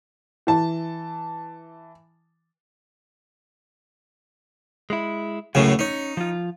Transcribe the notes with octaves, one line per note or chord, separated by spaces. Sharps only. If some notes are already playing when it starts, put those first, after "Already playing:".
E3 A5
G#3 E4
C#2 F#2 A2 C#3 F#3
C#4 D#4 C#5
F3 F4